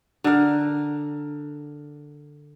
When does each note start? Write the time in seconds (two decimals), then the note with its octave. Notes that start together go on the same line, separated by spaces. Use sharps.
0.24 D3 A#4